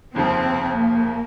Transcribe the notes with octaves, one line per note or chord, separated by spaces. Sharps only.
F1 D#2 C#3 F3 C4
A#3